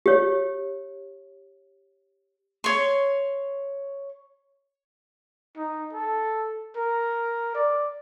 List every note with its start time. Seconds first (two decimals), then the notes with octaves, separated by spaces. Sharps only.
0.06 G4 C#5
2.64 C#5 C6
5.57 D#4
5.93 A4
6.76 A#4
7.55 D5